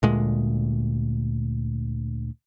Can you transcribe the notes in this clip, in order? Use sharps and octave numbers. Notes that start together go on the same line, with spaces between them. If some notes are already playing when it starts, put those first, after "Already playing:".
D2 A#2 G#3